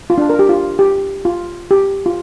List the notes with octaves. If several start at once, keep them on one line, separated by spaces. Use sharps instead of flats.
F4
D4
A#4
G4
F4
G4
F4
G4
F4